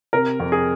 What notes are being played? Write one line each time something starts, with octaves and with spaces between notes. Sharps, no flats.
C3 A#4
F2
G#4